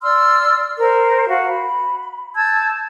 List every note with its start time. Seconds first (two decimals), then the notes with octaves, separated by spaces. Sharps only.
0.03 D5 C6 E6 F6
0.78 A#4 C5
1.29 F#4 F5
1.49 B5
2.35 A5 E6 G6 G#6